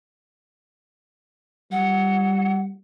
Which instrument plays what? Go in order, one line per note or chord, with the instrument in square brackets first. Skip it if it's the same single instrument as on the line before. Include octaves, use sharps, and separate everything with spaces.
[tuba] G3 [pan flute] F#5